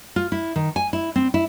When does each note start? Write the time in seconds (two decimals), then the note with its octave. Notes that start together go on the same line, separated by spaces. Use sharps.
0.16 F4
0.32 E4
0.56 D#3
0.76 G#5
0.93 E4
1.16 C4
1.34 E4